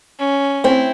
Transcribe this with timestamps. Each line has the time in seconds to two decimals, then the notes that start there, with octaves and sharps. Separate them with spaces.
0.19 C#4
0.64 C4 E4